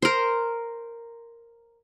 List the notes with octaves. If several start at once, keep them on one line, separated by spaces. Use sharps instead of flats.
A#4 C5